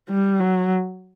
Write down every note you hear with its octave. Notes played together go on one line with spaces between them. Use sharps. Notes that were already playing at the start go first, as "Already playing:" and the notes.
G3
F#3